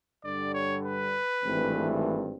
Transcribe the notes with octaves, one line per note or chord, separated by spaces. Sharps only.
G2 D3 G3 D5
C#5
B4
G#1 G2 E3 A3 C4